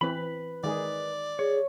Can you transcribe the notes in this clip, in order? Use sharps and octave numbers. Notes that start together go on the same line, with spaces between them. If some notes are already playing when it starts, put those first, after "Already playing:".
E3 C4 B4 B5
D#3 G#3 G#4 D5
G#4 C#5